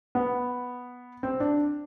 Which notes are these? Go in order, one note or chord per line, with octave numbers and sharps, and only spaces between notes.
B3
C4
D4